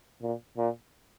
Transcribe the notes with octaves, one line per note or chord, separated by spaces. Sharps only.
A#2
A#2